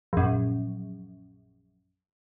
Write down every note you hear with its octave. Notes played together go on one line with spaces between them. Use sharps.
A#1 F#2